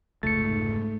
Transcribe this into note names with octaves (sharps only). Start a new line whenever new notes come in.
F1 C#2 G#2 A3 A6 C#7